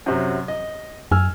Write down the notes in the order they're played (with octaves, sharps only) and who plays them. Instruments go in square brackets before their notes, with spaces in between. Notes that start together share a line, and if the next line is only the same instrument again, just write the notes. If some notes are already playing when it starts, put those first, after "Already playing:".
[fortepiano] F#2 C3 F#3
D#5
[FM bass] F#2 [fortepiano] G#5 E6 F6